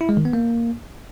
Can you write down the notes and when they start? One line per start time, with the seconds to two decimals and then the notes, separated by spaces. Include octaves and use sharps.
0.01 E4
0.09 G#3
0.17 D#3
0.25 B3
0.33 A#3